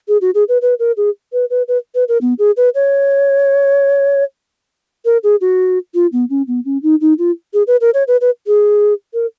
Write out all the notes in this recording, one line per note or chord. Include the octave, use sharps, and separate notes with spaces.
G#4
F#4
G#4
B4
B4
A#4
G#4
B4
B4
B4
B4
A#4
B3
G#4
B4
C#5
A#4
G#4
F#4
F4
B3
C#4
B3
C#4
D#4
D#4
F4
G#4
B4
A#4
C#5
B4
B4
G#4
A#4